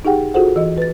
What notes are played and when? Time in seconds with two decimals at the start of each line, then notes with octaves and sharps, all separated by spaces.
0.05 D#4 G4 G#4 F#5 G5
0.34 F4 F#4 G#4 A4 C5 F#5
0.56 E3 D#5
0.78 B4 A6